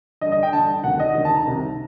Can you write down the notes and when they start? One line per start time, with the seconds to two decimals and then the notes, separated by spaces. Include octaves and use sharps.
0.21 G2 D3 D#5
0.32 D#5
0.43 G5
0.53 D3 A5
0.57 G2
0.83 D2 C3 D#3 F#5
1.00 D#5
1.14 D2 C3 D#3 D#5
1.25 A5
1.36 A#5
1.45 C2 C3 D#3